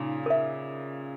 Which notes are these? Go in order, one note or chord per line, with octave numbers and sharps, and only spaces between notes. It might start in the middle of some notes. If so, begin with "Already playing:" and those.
Already playing: A#2 C#3 D#4
A#4 E5